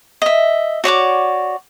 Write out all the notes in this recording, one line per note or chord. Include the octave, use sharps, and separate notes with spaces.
D#5 E5
F#4 C#5 D5 D6